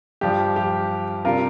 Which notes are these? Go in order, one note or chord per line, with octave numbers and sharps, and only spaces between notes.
G2 F3 G4
G4
C3 G3 F4 A#4